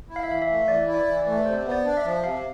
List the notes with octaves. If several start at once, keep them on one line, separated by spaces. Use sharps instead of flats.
E4
F5
E5
E3 F5
E5
A3
E3 D5
E4
D5
E3
D5
A3
C3 C5
B3
D5
D4
E5
F3
C3 F5